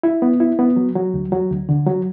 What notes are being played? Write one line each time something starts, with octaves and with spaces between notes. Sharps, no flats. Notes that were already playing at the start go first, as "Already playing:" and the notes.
E4
B3
E4
B3
F#3
F#3
D2
F#3
D2
D3
F#3